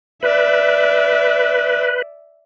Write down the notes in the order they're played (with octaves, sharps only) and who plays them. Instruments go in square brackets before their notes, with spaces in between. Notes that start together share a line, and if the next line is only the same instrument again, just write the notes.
[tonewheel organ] B4 [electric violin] D5 E5